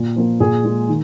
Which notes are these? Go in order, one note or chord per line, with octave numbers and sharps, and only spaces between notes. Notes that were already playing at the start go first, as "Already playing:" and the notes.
Already playing: A#2
F3 A#3
A#2 G#4
G#3
D#3